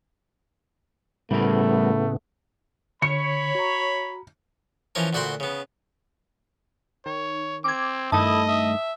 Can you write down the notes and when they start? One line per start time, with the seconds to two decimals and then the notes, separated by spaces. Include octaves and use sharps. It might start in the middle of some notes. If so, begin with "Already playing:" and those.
1.31 A2 C#3 G3 A3 B3 E4 A#4
3.02 D3 C#5 B5 C#7
3.55 F#4 A#5
4.95 E3 F3 C#4 A#4
5.13 D2 A#2 F#4 G5 B5 C6
5.40 C#3 B3
7.06 D#3 C#5
7.64 C4 D6 G#6
8.12 G2 D#3 A3 E4 D#5 A5 D#6
8.49 E5